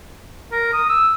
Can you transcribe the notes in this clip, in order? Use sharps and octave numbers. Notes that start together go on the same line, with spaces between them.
A#4
D#6
E6